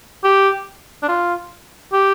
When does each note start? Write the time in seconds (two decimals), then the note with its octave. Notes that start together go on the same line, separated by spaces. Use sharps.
0.24 G4
1.03 D4
1.09 F4
1.93 G4